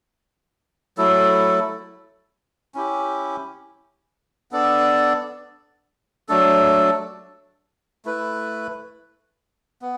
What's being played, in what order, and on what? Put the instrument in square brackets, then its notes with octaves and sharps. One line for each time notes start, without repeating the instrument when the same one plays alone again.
[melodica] F#3 A3 E4 A4
C#4 E4 G4
B3 D4 A4 D5
F#3 A3 D4 A4
A3 E4 B4
B3